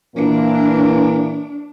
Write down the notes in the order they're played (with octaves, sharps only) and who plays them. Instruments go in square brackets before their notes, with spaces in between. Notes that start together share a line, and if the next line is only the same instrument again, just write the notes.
[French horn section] A#2 E3 A#3 [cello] D4